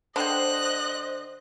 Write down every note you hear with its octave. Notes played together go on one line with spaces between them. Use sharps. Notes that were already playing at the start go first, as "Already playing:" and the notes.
D3 C5 D#5 G5 F#6